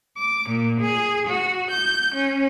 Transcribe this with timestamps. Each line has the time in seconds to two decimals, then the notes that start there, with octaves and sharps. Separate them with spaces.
0.19 D6
0.50 A#2
0.80 G#4
1.27 F#4
1.71 G6
2.15 C#4